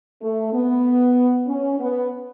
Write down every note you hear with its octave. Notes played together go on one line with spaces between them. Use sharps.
A3
B3
C#4
B3